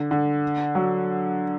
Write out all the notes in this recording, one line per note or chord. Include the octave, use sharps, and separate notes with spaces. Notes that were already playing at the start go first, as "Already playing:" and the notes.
Already playing: D3
D3
F#3